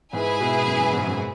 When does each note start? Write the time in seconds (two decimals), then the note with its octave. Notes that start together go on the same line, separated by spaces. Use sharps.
0.13 G#2 E4 G#4 B4 G#5
0.40 B2
0.66 F#2
0.79 F#2
0.93 G#2
1.06 F#2